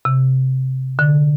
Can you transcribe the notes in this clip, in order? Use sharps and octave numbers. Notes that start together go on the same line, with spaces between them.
C3
D3